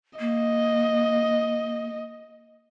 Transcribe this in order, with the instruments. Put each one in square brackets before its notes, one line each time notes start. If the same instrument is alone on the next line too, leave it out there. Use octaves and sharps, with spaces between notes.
[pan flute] A#3 [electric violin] D#5